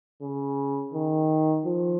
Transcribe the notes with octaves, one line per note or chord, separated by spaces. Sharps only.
C#3
D#3
F3